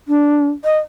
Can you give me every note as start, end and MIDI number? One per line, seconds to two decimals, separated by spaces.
0.08 0.46 62
0.64 0.78 75